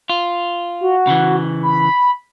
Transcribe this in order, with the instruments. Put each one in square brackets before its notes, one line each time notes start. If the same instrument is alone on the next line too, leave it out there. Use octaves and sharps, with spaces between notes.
[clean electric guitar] F4
[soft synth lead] F#4
[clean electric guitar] C#3 E3
[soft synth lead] B5